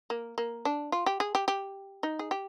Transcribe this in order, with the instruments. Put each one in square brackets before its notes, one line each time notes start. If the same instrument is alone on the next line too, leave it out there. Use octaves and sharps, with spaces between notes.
[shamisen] A#3
A#3
D4
F4
G4
G#4
G4
G4
D#4
G#4
G4